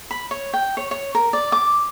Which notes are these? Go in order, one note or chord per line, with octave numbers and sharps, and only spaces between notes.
B5
C#5
G5
C#5
C#5
A#4
D5
D6